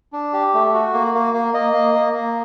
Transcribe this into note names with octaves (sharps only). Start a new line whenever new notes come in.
D4
G4
A3
F#4
A#3
A#3
A#3
A#3 D#5
A#3
A#3
A#3